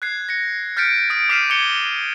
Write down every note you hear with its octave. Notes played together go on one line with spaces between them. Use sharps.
F#6 G#6 C7
A#6 C#7
F6 G6 A6 B6 C#7 D7
D#6 D7
D6 F6 B6 C7 D#7 E7
D6 G#6 C#7 G7